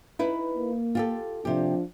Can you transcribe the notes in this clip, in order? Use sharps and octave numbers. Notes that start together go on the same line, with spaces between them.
D#4 E4 B4
A#3
F4 G4 A4
C3 F3 D4 G4